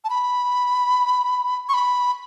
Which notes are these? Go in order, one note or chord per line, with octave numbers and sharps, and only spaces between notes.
A5
B5
C#6
B5